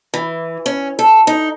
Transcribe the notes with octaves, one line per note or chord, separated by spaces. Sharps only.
E3
C#4
A4
D#4